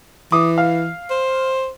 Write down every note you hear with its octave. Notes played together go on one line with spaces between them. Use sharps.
E3 D6 D#6
F5
C5